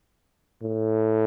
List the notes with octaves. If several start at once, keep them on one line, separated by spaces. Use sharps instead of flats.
A2